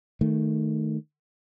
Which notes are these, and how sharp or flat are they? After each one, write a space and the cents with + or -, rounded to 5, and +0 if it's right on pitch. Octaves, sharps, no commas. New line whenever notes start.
D#3 -5 A3 +0